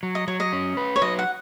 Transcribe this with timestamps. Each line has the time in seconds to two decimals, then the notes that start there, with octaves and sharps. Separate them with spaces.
0.03 F#3
0.15 D#5
0.28 F#3 C#5
0.40 D#5
0.53 C#4
0.77 B4
0.96 C#5
1.02 F#3 D#5
1.19 F#5